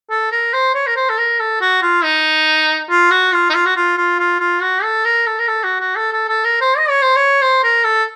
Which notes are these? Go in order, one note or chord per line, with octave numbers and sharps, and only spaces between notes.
A4
A#4
C5
C#5
A#4
C5
A4
A#4
A4
F#4
F4
D#4
F4
F#4
F4
D#4
F4
F#4
F4
F4
F4
F4
F#4
A4
A#4
A4
A#4
A4
F#4
F#4
A4
A4
A4
A#4
C5
D#5
C#5
C5
C#5
C5
A#4
A4